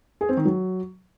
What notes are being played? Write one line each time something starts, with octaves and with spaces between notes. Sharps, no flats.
G#4
C4
D#3
F#3